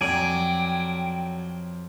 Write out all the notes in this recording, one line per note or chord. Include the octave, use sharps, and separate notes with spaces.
F2 F#3 D5 G5 G#5